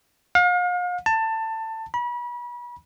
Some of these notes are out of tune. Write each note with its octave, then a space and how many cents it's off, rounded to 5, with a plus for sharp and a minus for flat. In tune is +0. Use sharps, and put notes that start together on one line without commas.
F5 +40
A5 +20
B5 -35